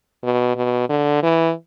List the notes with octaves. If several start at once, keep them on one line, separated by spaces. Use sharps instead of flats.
B2
B2
D3
E3